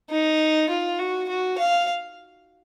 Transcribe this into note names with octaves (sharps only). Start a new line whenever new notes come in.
D#4
F4
F#4
F#4
F5